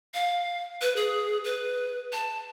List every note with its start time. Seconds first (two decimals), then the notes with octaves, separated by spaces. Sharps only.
0.14 F5
0.81 B4
0.96 G#4
1.44 B4
2.13 A5